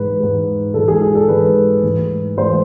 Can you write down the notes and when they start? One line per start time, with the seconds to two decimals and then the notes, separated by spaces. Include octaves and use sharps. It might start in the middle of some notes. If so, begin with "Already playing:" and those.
Already playing: G#2 E3 G#3 B4
0.19 G#2 E3 G#3
0.74 G#2 E3 G#3 A4
0.88 G#4
1.02 G#4
1.15 A4
1.28 G#2 E3 G#3 B4
1.83 G#2 E3 A3
2.37 G#2 E3 A3 C5